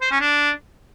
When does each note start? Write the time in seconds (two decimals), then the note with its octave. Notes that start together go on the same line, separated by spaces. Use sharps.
0.02 C5
0.11 C#4
0.21 D4